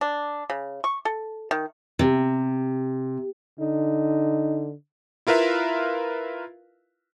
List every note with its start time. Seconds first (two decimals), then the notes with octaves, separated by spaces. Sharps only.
0.01 D4
0.50 C#3
0.84 C#6
1.05 A4
1.51 D#3
1.99 C3
3.60 D3 D#4
5.27 E4 F4 A#4 B4 E5 F5